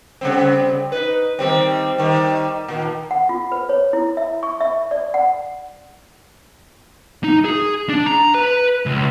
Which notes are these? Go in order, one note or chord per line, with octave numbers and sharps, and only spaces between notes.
C#3 G3 C4
D#4 B4
D#3 G3 C4
D#3 G3
A#2 D#3
F#5
F4
B4
C#5
E4
E5
C#6
E5
D5
F#5
D#4
G#4
D4
A#5
B4
C#2